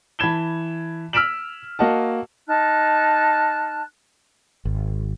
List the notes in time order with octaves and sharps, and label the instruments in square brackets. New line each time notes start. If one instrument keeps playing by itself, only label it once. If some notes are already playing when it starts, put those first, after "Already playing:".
[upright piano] E3 A5 B5 G#6 E7 G7
E6 F6 B6 D7 E7 F#7
A#3 F#4 D#5 F#5 A5
[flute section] D#4 A5 F6 F#6
[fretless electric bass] G#1